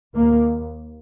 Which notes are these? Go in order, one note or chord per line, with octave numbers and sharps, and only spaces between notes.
D#2 A#3